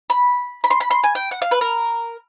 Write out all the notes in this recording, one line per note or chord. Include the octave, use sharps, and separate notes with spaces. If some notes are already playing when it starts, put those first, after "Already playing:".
B5
B5
C6
B5
C6
G#5
G5
F#5
F5
B4
A#4